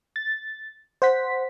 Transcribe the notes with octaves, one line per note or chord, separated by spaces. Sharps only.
A6
C5 F#5 B6